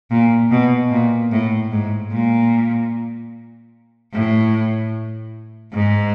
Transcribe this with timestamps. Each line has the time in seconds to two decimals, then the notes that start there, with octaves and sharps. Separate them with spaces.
0.10 A#2
0.51 B2
0.91 A#2
1.31 A2
1.71 G#2
2.11 A#2
4.13 A2
5.72 G#2